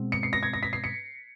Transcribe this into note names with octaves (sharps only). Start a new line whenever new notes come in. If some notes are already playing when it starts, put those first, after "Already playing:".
Already playing: B2 G#3 C4
C#7
C7
A#6
G#6
A#6
B6
C7
C#7